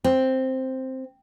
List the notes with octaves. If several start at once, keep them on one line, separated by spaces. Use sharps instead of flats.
C4